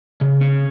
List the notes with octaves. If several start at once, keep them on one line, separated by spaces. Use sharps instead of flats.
C#3
C#4